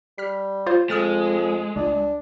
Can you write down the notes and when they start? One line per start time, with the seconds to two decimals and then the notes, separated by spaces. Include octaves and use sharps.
0.18 G3 F6 B6
0.66 F4 C5
0.90 F2 G#3 D#6 F6 A6
1.76 C#2 D4